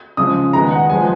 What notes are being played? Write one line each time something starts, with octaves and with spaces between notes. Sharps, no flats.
C#3 F3 G#3 D#6
D#3 G#3 B3 A#5
F#5
F3 G#3 B3 G#5